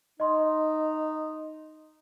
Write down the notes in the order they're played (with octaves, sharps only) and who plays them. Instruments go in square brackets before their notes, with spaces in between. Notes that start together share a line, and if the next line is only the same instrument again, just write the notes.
[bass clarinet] D#4 [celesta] D#5 C6